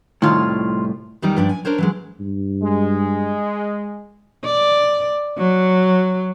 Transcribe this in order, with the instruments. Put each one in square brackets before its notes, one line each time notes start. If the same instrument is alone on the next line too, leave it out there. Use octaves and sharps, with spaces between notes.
[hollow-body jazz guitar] C2 A2 [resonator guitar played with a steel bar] D#3 F4
[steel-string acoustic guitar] E2 D#3 G3 D#4
G2 F3 D4 D5 G5
G#5
D4 A#4 C5 C#5
E3 F#3 G#3
[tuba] G2
[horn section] G#3
[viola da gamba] D5
F#3